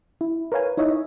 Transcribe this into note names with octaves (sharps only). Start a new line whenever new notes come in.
E4
A#4 B4 C#5 F5 G#5
D#4 E4 C#5 D#5 E5